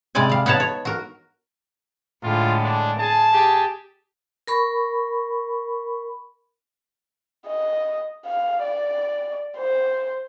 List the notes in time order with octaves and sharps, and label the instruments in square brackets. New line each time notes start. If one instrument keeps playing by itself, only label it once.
[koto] C3 G3 G#3 D5 G#5
G3 F5
B3 D#4 C#5 F#5 A5
C#5
F#4 A#4
[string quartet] A2 D3 G#3 [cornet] F4
[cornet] D4
[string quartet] G#4 [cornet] A5
[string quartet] G4 G#4
[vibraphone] A#4 B5 C#6
[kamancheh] D#5
F5
D5
C5